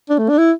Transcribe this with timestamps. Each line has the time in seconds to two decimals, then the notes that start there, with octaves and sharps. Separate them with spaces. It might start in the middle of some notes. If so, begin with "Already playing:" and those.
0.09 D4
0.18 A3
0.29 D4
0.38 E4